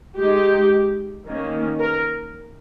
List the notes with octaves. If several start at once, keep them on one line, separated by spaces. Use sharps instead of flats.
G#3 D#4 G4
D#3 A#3 C#4
A#4